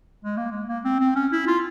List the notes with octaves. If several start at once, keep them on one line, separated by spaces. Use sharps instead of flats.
G#3
A#3
G#3
A#3
C4
C4
C#4
E4
F4